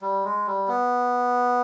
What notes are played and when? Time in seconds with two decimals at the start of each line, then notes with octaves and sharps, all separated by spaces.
0.02 G3
0.24 G#3
0.46 G3
0.68 B3